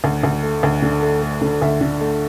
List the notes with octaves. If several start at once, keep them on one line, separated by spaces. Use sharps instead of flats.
D2
D2
A3
D2
D3
A3
A3
D3
D2 E5
D3
A3